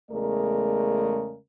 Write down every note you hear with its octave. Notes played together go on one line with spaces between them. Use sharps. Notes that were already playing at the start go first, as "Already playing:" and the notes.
E2 C#3 G#3 A3 A#4 D5